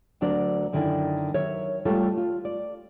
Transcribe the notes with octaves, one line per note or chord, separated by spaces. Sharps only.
D2 F#3 D4 A#4 D5
F#2 D3 D#3 E4 D5 G#5
F#3 A#4 C#5 E5
G3 A3 F4 A4 C#5
F4
D5